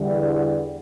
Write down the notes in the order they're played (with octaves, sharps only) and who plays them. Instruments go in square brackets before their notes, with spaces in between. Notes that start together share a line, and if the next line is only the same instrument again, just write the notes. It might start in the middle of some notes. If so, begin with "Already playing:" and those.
Already playing: [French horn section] E2 D3 G3